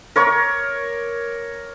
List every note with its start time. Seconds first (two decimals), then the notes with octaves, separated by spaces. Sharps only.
0.16 A#4 C#5 C#6 D6